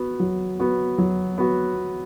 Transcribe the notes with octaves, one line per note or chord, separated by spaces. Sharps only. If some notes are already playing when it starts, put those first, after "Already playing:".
Already playing: B3 F#4
F#3
B3 F#4
F#3
B3 F#4